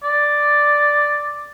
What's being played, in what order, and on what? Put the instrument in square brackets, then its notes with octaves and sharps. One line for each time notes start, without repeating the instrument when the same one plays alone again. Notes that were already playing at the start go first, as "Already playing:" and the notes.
[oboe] D5